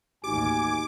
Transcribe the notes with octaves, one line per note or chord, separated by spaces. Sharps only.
A1 D#2 D#4 F#4 G4 G#5 D6